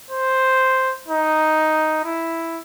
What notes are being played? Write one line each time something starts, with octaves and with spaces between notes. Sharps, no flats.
C5
D#4
E4